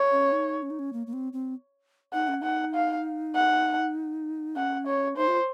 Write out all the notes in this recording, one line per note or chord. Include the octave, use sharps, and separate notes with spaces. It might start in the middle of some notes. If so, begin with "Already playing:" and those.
Already playing: C#5
C#4
D#4
C#4
D#4
C#4
A#3
A#3
C4
C4
D#4 F#5
C#4
D#4 F#5
F5
F#5
C#4 F#5
C#5
D#4 C5
F4